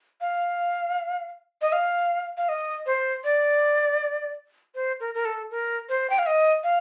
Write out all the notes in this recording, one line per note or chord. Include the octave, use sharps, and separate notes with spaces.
F5
D#5
F5
F5
D#5
C5
D5
C5
A#4
A#4
A4
A#4
C5
G5
F5
D#5
F5